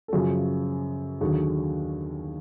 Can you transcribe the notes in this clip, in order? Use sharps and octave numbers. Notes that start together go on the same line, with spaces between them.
A4
F#2 C#3 F3 F#4 G#4
D#2 D3 F#3 F#4 G#4